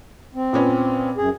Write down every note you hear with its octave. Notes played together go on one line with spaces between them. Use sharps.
C4
A#2 B3 C#4
F#2 G#4